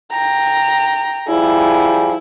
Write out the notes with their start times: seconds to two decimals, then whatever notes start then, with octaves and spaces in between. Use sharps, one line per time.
0.12 G5 A#5
1.28 F3 G3 E4 G#4